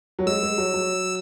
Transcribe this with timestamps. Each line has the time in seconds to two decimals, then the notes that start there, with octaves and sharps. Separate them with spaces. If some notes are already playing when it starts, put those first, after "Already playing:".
0.19 F#3
0.26 G#3 E6
0.43 G#3
0.58 F#3
0.74 F#3